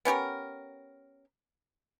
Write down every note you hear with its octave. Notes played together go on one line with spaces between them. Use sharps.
B3 C#4 G4 A#4